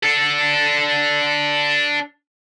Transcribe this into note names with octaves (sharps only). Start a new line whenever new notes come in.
D4 A4